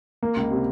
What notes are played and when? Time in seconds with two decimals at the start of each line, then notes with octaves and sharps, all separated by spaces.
0.23 A#3
0.37 C#2
0.51 C3